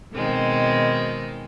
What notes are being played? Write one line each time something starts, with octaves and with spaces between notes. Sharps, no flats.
B2 D#3 G#3 C4